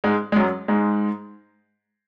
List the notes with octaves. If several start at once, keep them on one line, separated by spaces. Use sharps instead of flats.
G#2 G#3
G#3
F#2 F#3
G#2 G#3